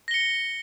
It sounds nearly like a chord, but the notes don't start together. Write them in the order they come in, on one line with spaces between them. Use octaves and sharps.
A#6 G7 C#7